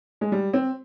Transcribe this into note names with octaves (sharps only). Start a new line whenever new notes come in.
G#3
G3
C4